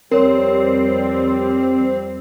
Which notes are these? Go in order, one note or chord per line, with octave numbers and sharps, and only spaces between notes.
F2 G3 C4 A#4 C#5